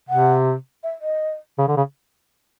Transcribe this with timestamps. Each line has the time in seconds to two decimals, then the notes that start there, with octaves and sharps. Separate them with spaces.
0.09 C3 F#5
0.83 E5
1.01 D#5
1.58 C#3
1.68 D3
1.77 C#3